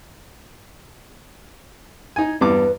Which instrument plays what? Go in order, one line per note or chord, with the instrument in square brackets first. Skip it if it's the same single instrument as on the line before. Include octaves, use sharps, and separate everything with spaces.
[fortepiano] D#4 G#5 [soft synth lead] G#6
[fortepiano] E2 G2 D6 [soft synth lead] B4